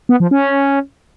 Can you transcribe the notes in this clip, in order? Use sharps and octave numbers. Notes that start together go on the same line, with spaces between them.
B3
F3
C#4